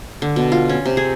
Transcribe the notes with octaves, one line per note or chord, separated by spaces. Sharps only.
D3
B2
F4
C#4
C3
G#4